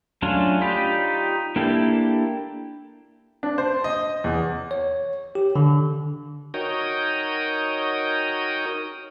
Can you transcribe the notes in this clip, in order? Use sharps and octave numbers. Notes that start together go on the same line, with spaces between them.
F#3 A3 C#4 D4 F4
D#4 F4 G4 D5 B5
A#3 D4 E4 G4 A4
D4
C5
D#5
E2
C#5
G4
D3
D#4 F#4 A#4 C#5 G5 D#6